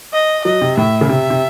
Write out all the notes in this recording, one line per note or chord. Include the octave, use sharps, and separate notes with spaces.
D#5
F#3 D#5
C3
A2 E5
C#3
C3 E5
C3